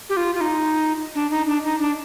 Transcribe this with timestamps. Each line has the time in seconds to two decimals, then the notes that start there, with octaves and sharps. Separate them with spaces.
0.09 G4
0.17 F4
0.35 F4
0.41 D#4
1.15 D4
1.31 D#4
1.47 D4
1.64 D#4
1.80 D4